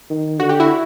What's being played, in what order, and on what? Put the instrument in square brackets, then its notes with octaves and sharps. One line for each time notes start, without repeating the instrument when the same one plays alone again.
[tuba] D#3
[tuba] D3 [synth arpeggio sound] F#4
[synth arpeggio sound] G4
E4 F#4